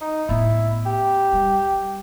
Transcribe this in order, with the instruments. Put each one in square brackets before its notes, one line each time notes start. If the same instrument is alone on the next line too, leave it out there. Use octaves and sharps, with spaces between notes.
[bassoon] D#4
[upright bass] A2 B3 [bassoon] E4
[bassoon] G4
[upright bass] G3